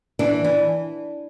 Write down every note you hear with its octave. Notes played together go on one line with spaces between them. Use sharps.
E3 D4
E3